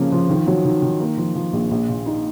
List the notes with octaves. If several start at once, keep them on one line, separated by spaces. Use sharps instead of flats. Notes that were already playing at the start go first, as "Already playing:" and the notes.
Already playing: C#3 F3 A#3
F3
D#3
F#3
D#3
D#3
A#3
F3
F3
A#1
A#1
A#2
D#4